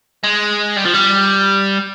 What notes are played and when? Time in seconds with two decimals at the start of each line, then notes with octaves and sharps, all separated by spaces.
0.24 G#3
0.76 G3
0.85 F3
0.94 G3